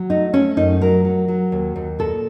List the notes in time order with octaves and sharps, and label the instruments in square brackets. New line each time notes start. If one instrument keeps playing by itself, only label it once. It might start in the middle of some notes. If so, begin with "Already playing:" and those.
Already playing: [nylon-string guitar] F#3
A3 D#4
A3 C#4
F#2 D#4
F#3 A#4
F#3
F#3
D#2
D#2
A#2 A4